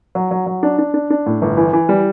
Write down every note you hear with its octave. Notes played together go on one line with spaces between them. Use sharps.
F#3
F#3
F#3
D4
D4
D4
D4
A2
G1
E3
E3
G3